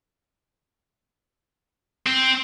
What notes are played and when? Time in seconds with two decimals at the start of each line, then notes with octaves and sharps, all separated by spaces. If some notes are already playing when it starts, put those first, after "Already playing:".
2.06 C4